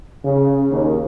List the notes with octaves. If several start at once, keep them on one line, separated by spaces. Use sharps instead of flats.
C#3
D#2